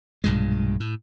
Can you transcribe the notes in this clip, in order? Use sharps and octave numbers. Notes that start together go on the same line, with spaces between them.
B1 G2 A#2 G#3
A2